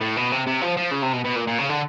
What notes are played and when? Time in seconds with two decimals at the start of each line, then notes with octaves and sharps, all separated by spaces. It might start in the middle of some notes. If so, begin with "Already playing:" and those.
0.01 A2
0.17 B2
0.32 C3
0.47 C3
0.61 F3
0.77 F3
0.91 C#3
1.03 C3
1.14 B2
1.25 B2
1.36 A#2
1.48 A#2
1.58 C#3
1.69 D3